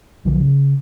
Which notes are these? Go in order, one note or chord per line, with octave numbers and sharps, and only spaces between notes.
B1 D3 F3 F#3
C#3